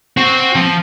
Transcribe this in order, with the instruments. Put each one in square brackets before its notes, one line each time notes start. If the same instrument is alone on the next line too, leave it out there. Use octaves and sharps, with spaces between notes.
[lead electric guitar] C4 [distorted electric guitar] F#4
[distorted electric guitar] F3